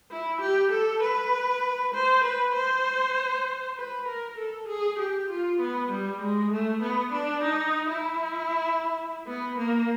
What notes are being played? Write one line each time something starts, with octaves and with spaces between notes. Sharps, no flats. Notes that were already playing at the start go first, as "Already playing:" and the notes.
E4
G4
A4
B4
C5
B4
C5
B4
A#4
A4
G#4
G4
F4
B3
G3
G#3
A3
B3
D4
D#4
E4
B3
A#3